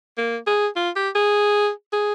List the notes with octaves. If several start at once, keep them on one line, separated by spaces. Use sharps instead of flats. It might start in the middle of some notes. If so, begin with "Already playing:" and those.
A#3
G#4
F4
G4
G#4
G#4